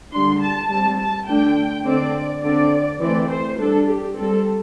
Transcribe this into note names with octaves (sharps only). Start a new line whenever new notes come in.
D3 G3 D4 C6
A5
G3 C4 A5
A5
D3 A3 D4 G5
D3 C4 D5
D3 C4 D5
E3 A3 C4 D5
C5
G3 D4 A4
G4
G3 C4 A4